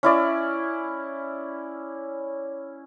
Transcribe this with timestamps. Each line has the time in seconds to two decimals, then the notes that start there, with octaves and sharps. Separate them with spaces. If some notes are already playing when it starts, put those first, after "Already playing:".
0.03 C#4 E4 D5